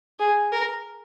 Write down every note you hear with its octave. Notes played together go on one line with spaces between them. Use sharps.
G#4
A#4